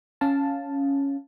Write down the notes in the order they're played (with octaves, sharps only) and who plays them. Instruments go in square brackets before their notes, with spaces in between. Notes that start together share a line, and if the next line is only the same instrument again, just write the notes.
[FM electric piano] C#4 F5 A5